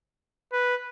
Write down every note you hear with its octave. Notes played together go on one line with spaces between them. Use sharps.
B4